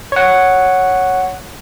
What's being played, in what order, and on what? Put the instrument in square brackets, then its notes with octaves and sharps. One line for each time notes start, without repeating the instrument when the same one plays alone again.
[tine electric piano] C#5 F#5